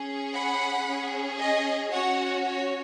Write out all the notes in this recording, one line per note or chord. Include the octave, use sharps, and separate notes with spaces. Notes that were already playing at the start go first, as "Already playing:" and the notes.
Already playing: C#4 G#4
F#5 B5
C#4 G#4
D#5 G#5
C#4 F#4 C#5 F#5
C#5